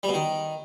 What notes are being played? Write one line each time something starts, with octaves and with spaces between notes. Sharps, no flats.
G3
B2
D#3